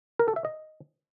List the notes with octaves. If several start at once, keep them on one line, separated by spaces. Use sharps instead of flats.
A#4
A4
E5
D#5